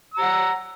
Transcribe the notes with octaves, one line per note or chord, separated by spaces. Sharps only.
F#5 A#5 E6